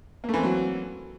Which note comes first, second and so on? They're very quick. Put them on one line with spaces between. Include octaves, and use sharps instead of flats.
A#3 A3 E3 C4 F#3